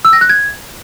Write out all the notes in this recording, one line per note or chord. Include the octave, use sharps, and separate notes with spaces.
E6
A#6
F#6
G#6